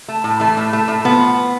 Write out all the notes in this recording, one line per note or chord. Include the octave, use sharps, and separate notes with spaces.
A3
A2
E3 A3
A2
A3
A2
F3 B3